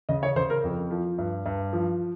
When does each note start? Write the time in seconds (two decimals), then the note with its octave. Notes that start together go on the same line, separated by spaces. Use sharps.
0.09 C#3 D#5
0.23 C#5
0.36 C#3 C5
0.50 A#4
0.64 F2
0.91 F3
1.18 G2
1.46 G2
1.73 F3